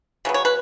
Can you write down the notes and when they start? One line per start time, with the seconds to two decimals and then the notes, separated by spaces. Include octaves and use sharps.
0.25 C#3 F#3 B3
0.34 C#5
0.45 B4